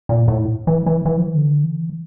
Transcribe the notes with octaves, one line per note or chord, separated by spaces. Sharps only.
A#2
A2
E3
E3
E3
F3
E3
D3
E3